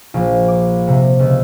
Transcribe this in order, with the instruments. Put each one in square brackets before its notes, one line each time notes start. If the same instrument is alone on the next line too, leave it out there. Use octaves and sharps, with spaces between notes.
[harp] A#1
D6
C3
C#2